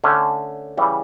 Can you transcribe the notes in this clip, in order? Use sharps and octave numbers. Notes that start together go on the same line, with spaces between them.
D3 A3 C#4
C#3 E3 G3